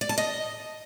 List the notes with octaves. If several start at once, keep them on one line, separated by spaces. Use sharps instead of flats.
D5
A5
D#5